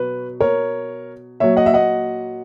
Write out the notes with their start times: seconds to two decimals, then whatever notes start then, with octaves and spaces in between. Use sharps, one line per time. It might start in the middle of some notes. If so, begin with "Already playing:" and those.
Already playing: B2 F#3 B4
0.41 A#4 C#5
1.40 A#2 F#3 C#5 E5
1.57 D#5 F#5
1.66 E5
1.74 D#5 F#5